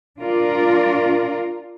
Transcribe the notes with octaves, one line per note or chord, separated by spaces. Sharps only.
D4 F4 A#4 D5